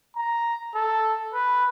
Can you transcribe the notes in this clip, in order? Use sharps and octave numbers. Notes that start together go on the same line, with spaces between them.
A#5
A4
B4